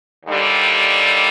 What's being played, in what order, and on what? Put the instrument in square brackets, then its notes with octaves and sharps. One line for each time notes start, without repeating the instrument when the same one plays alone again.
[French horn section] D#2 D3 G3